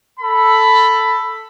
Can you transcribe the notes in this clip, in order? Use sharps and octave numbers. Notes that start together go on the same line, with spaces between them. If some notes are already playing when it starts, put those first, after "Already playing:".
A4 B5